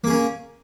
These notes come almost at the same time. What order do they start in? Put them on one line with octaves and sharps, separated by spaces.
A#3 G#4 C#4 A#4